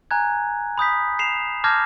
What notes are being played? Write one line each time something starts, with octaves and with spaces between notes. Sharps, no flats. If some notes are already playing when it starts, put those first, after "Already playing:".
G#5 A#5 F#6 G#6
B5 D#6 G6 B6
C7 E7 F7
A5 D6 F6 G6 G#6 A#6